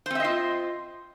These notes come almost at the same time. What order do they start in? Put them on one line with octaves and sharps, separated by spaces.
C5 C4 E5 D#5 F4